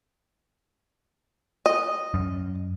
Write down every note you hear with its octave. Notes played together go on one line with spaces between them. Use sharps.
D#5
F#2